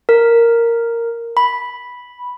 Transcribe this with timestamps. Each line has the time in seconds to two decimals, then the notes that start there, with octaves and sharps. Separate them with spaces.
0.09 A#4
1.37 B5